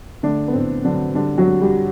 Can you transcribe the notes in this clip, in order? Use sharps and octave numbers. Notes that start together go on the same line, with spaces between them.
D3 A3 D4
B3
A2 C4
D3 F#3 D4
D3 G3 D4
F#3 F#4
G3
G3 G4